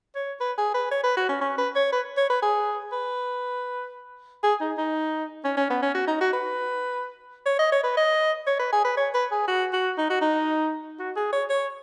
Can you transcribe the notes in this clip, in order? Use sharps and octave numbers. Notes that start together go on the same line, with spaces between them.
C#5
B4
G#4
B4
C#5
B4
F#4
C#4
C#4
B4
C#5
B4
C#5
B4
G#4
B4
G#4
D#4
D#4
C#4
C#4
B3
C#4
F#4
D#4
F#4
B4
C#5
D#5
C#5
B4
D#5
C#5
B4
G#4
B4
C#5
B4
G#4
F#4
F#4
D#4
F#4
D#4
F#4
G#4
C#5
C#5